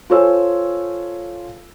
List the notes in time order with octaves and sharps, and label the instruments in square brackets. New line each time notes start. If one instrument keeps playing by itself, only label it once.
[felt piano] F4 A4 C5 C#5 G#5 E6